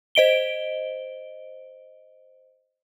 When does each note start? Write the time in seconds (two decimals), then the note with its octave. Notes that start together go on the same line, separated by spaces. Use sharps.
0.15 C5 D#5 D7 G7